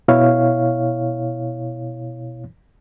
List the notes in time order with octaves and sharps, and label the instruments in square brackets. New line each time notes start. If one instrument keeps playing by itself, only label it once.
[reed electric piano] B2 E4 C#5 F5